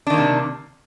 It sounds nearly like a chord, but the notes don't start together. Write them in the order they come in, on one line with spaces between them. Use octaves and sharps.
D4 D#3 A#3 C3